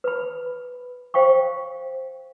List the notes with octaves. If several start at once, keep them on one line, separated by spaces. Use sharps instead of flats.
B4 B5
C5 F5 G5 C#6